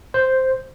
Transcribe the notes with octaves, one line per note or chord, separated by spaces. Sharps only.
C5